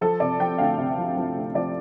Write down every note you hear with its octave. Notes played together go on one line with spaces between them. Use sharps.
F3 A4
C3 D5
F3 G5
D2 F5
C3
F3
F3
D2
F3 D5